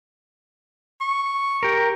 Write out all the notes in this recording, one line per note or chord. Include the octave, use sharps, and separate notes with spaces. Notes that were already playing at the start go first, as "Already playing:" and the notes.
C#6
G4 A#4